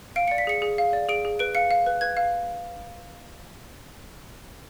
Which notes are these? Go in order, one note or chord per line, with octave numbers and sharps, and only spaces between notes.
F5 D7
D5 C#7
B6
G#4 C#7
G#4
F5
D5
G#4 D7
G#4
B4 D7
F5 C#7
F5
B4
B4 G#6
F5